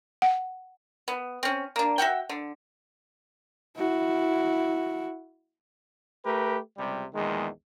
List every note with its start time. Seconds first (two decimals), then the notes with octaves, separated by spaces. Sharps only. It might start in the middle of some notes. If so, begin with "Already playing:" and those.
0.22 F#5
1.08 B3
1.43 C4 C#4
1.76 A#3 D4
1.98 F#4 E5 F#5 G5
2.29 D3
3.76 E4 F#4
6.25 A3 G4 A#4 B4
6.78 C#2 C3 G3
7.14 A#1 E2 D#3 G#3